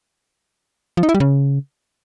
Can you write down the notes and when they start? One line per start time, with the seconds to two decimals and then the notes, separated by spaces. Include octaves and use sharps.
0.97 F3
1.03 D#4
1.09 E4
1.14 G3
1.20 C#3